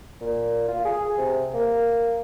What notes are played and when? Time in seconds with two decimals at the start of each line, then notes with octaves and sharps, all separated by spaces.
0.21 A#2
0.68 F4
0.85 G#4
1.18 C3
1.54 A#3